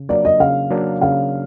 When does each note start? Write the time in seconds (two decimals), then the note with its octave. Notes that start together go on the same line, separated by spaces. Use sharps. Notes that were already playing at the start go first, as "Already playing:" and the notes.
Already playing: C#3
0.09 F#3 A#3 D4 D5
0.25 D#5
0.40 C#3 F5
0.70 F#3 A#3 D4
1.01 C#3 F5